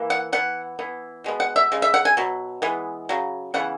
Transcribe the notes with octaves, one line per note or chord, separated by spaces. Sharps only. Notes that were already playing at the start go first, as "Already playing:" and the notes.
Already playing: E3 A#3
F#5
E3 B3 F#5
E3 B3
B2 G#3 B3
F#5
E5
C#3 G#3
E5
F#5
G#5
B2 F#3
E3 G#3 B3
C#3 F#3
C#3 E3 B3 F#5